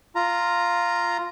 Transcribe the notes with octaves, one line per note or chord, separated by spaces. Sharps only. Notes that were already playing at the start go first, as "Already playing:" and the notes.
F4 A#5